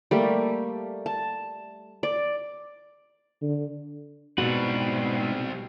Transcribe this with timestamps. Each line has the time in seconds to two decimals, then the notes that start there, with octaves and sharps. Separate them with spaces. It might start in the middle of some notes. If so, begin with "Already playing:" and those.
0.11 G3 A3 A#3
1.06 A5
2.03 D5
3.42 D3
4.38 G#2 B2 G3 C4 F#4 B4